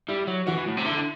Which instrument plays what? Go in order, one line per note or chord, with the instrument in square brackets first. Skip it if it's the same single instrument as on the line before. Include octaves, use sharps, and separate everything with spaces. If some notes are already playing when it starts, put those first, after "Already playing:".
[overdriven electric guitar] G3 [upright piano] E4
[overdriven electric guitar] F#3
[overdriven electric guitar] E3 [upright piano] F#4
[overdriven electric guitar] E3
A2
C3
[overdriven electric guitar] D3 [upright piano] E4